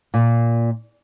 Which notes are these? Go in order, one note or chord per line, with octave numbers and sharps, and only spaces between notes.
A#2